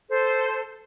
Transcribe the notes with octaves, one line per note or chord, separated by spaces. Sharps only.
A4 C5